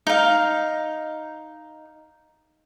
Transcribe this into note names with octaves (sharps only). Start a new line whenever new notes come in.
D#4 F5